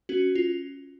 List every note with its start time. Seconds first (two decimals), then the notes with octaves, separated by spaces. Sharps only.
0.09 C#4 F#4
0.35 F4